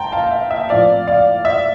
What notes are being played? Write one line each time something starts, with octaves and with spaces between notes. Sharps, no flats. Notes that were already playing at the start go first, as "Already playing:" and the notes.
Already playing: G5 A5 A#5 C6
F5 A5
E5
E5
A2 F3 C4 D5 F5
D5 F5
E5